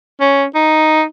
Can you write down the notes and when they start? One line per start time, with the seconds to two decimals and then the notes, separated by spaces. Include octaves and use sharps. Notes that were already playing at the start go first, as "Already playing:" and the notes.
0.21 C#4
0.56 D#4